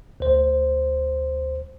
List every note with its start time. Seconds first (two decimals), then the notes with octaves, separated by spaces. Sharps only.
0.20 D2 C5